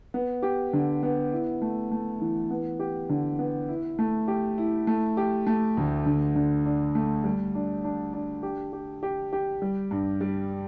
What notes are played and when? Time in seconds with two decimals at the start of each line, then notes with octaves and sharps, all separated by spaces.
0.14 B3
0.42 G4
0.73 D3
1.03 B3
1.32 E4
1.62 A3
1.91 A3
2.21 E3
2.51 B3
2.80 G4
3.09 D3
3.39 B3
3.69 E4
3.99 A3
4.28 G4
4.58 E4
4.87 A3
5.17 G4
5.47 A3
5.77 D2
6.06 D3
6.35 D3
6.65 D4
6.95 A3
7.24 G3
7.55 D4
7.84 D4
8.13 D4
8.43 G4
8.73 G4
9.03 G4
9.33 G4
9.62 G3
9.91 G2
10.21 G3